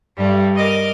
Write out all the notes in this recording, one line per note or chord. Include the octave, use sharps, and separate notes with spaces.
G2 G3 A3
A#4 D#5 D6 F6